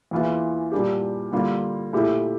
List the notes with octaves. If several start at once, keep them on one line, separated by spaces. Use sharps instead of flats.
E2 E3 A#3 F4
A#2 G3 A#3 D4 G4
D3 G3 A#3 F4
A#2 A3 E4 G4